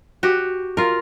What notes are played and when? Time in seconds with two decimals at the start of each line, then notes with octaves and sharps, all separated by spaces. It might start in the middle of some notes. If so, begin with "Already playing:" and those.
0.23 F#4 G4
0.77 F4 A#4